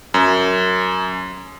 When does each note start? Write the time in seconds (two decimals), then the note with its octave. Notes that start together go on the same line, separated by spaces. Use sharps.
0.14 F#2